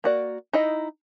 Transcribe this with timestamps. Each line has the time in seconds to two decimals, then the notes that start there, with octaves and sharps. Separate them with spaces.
0.04 A#3 F#4 D5
0.53 D#4 E4 D#5